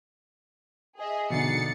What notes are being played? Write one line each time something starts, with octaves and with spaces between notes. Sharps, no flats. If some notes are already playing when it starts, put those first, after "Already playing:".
G#4 D#5 E5
B2 D3 D#4 A6 C7 C#7